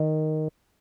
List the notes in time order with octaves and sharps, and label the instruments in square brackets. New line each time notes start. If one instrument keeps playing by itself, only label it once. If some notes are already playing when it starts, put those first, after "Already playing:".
Already playing: [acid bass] D#3